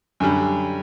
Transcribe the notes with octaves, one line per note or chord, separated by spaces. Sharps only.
F#2 D3 G3